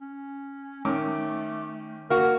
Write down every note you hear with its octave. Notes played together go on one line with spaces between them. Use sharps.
C#4
D#3 A3 C#4 D6
A#3 F#4 A#4